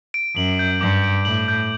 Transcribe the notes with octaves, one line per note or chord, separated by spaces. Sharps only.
D7
F#2 F#7
G6
G2 D6
D7
A2 F#7
G6